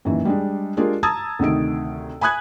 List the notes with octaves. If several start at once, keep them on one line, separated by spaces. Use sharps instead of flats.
F#2 A#2 D#3 E3
G3 G#3 D4
G#3 D4 F4 G4 G#4 A#4
A5 A#5 D#6 E6 G#6 A6
D2 C3 D#3 D7
G#5 B5 D#6 F#6 G#6